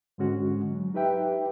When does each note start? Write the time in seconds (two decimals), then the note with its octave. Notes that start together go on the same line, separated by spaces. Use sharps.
0.18 G#2 D3 G#3 C#4 F#4
0.71 F#3
0.94 D#4 G4 B4 E5 G5